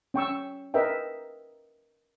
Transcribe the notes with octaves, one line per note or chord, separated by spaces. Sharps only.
C#4 G5 C#6 E6
A#4 B4 D#5 E5 G5